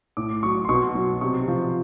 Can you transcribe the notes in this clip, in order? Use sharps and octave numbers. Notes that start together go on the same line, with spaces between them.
A2 D6
F#3 C#6
C6
B2 C#6
F#3
C3 C#6
F3